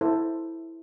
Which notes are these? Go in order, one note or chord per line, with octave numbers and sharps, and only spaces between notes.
E4 A4 C5